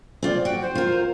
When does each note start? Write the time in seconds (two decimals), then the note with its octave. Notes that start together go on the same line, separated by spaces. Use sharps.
0.23 C4 F4 D5
0.45 F#4 G5
0.62 C5
0.75 F4 A#4